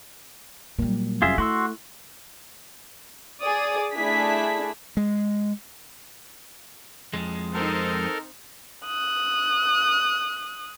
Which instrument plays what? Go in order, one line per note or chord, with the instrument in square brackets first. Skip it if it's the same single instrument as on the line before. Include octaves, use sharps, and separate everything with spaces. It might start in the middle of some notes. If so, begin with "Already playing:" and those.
[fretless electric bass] A#2 A#3 [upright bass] F#3 G3
[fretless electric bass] F1 F#2 C#4 [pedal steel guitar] F4 G#4 E5
[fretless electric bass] A3 [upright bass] E4 [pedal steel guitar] F#4 C6 E6
[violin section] G#4 D5 D#6
A3 D4 E4 G#4 B6
[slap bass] G#3
[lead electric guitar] F2 G#3
[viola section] C4 D#4 [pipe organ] A4 A#4
[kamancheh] D#6 F#6